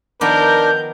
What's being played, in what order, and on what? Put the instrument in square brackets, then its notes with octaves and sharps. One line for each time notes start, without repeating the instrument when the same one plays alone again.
[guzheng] D#3 F3 B3 [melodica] D4 D6 [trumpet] A#4 [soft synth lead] G6